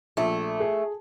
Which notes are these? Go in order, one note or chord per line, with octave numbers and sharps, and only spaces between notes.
A#1 A3
G#4